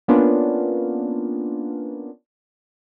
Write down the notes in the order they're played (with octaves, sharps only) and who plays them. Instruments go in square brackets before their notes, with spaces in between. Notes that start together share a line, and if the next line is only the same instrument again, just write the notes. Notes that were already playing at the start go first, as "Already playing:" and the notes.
[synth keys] A#3 B3 C#4 D4 F4